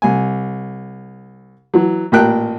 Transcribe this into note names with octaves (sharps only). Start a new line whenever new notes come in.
C2 G#5
E3 F#3
A1 A#2 A#4 G5 F#6